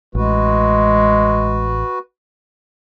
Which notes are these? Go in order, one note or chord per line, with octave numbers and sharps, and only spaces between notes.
A1 G#3 F#4 B4